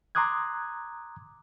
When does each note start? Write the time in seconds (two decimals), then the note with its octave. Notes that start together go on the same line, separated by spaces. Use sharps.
0.15 A#5 C6 D6 D#6 F#6 G#6